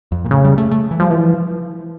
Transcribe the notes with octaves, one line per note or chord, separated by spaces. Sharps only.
F2
A#2
A2 C#3
G3
A3
A3
E3
F3 G3
E3 F3